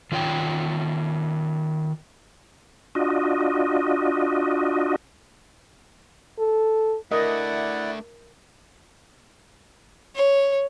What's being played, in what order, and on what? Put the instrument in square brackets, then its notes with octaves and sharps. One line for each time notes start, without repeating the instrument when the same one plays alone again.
[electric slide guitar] D#3 F4 C#5 G5
[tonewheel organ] D4 F4 F#4 D#5
[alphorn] A4
[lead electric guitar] A3 D4 [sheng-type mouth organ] E4 D5 F#5 [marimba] A#4 [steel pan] D#5
[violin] C#5